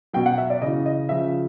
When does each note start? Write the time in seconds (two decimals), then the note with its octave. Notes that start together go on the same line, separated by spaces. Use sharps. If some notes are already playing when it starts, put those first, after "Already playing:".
0.13 B2 F#3 G5
0.26 F#5
0.38 E5
0.50 D5
0.62 C#3 E3 D#5
0.86 D#5
1.09 C#3 F3 E5